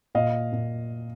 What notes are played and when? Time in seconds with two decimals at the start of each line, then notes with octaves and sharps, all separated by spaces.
0.15 A#2 D#5 F5
0.53 A#2